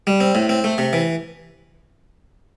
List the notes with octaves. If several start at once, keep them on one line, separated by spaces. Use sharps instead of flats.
G3
C4
A2
C4
A3
C3
E3